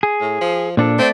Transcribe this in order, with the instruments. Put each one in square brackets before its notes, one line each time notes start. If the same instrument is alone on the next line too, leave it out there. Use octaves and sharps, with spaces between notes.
[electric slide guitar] G#4
[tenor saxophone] A2
F3
[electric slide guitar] A#2 D4 A4 [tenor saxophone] F3
[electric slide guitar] A3 D5 [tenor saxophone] C4